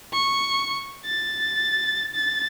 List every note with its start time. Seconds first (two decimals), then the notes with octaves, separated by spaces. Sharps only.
0.13 C#6
1.06 A6
2.15 A6